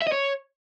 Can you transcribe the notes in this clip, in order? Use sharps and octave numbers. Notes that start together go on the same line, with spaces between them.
E5
D#5
C#5